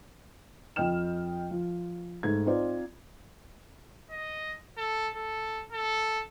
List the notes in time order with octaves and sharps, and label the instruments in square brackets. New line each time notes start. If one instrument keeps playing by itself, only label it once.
[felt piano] F2 D#5 G5 F6 E7
F3
G#2 A3 G#6
C4 D#4 F4 C5 D5
[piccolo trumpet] D#5
A4
A4
A4